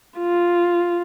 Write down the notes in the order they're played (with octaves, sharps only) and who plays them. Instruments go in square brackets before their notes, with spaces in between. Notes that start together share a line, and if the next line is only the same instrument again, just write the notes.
[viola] F4